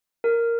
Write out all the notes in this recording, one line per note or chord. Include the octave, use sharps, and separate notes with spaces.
A#4